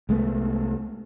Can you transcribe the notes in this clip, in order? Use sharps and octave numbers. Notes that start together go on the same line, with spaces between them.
C2 G#3 A3 B3